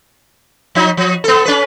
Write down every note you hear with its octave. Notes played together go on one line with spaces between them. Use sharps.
F3 D#4
F3
B3 A4
C#4 B4